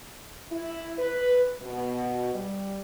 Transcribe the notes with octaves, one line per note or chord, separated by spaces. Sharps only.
E4
B4
B2
G3